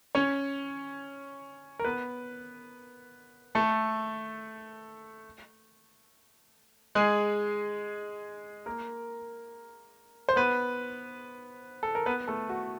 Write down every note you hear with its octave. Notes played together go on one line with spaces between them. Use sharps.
C#4 C#5
A#4
B3 B4
A3 A4
G#3 G#4
A#3 A#4
C5
B3 B4
A4
A#4
B3 B4
A3 A4
F#4